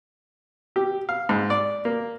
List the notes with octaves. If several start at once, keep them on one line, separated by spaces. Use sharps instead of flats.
G4
F5
G#2
D5
A#3